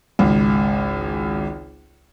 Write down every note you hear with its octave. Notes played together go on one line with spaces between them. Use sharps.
G#1 C#2